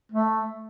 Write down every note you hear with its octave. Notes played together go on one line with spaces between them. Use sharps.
A3